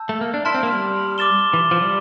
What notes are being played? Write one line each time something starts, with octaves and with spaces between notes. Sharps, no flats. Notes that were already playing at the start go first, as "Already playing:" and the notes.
Already playing: A5 E6 G6
A3
A#3
D4
E4 A5 C6 F6
C4
A#3
G3
D6 A6 E7 G7
E3
F3
G3